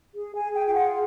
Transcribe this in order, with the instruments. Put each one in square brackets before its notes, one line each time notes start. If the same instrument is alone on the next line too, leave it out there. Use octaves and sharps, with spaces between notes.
[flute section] G#4
G#5
G#4
G5
F4 G5
F#5